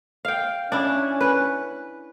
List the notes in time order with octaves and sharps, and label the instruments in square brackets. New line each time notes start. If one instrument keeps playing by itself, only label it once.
[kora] F5 G5
[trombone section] C#4 [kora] D4 E4
[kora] B4